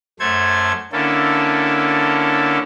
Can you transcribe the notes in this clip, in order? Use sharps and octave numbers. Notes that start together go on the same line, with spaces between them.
F#2 A3 A4 C5 G#6
D3 A#3 C#4 E4 A4